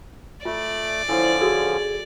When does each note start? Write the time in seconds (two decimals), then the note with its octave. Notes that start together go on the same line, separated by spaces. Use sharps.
0.45 A3 F4 D5
1.09 D3 F3 C#4 E4 C5
1.41 F#4 G#4 A4 E6